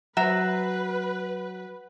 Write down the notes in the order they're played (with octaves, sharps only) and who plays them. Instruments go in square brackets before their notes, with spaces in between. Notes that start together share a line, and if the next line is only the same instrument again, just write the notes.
[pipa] C3 E5 A#5 [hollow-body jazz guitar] F#3 [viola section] B4 [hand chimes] F#5